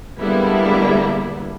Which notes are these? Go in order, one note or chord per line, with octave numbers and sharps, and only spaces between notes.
D3 G3 G#3 A#3 B3 E4